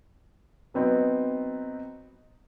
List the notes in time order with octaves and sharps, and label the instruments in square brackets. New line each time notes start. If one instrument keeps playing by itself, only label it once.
[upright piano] F#3 B3 C4 D#4